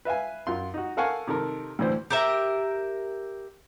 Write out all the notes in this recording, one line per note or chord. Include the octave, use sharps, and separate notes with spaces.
B4 E5 F5 G#5
F#2 F4 C6
D#4 F#4
A4 A#4 F5 F#5 G#5 C#6
C3 D#3 A4 A#4
D2 A2 E3 C5
G4 A#4 E5